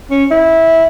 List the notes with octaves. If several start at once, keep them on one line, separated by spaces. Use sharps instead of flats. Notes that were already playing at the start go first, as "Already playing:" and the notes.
C#4
E4